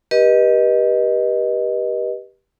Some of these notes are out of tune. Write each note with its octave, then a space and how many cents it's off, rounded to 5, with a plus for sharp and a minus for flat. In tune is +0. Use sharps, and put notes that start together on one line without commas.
G4 +0 B4 -35 D#5 +0